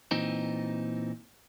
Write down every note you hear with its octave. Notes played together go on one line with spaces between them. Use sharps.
A#2 E3 C4 D#4